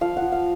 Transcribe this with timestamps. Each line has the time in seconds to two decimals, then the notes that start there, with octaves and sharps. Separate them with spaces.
0.01 F3 F5
0.17 F#5
0.22 F3
0.32 F5